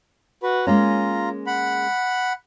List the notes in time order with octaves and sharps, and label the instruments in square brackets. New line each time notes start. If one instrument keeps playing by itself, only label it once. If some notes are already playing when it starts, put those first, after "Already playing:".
[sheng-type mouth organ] F#4 B4
[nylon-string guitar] G#3 A#3 C#4 [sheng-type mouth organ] F4 A#5
[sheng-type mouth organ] F#5 B5